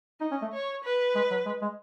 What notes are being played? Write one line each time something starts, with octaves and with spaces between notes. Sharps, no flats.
D#4 D#5
C#4
A3
C#5
B4
G#3
F#3
G#3
G#3